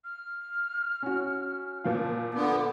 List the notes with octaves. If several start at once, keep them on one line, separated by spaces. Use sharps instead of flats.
F6
C#4 F#4
A#2 F3 F4
D3 B3 D6